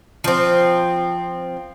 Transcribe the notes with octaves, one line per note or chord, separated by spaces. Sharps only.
F3 C4